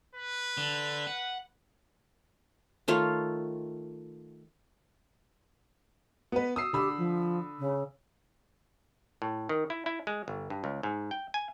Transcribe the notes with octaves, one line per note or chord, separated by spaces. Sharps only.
B4
D3
F#5
D#3 A3 F4 C#5
B3 B4
D#6 E6 C7
D3 G4 B5 E6
F3
C#3
A2
D#3
E4
E4
G#3
G1
G2
C#2
G#2
G5
G#5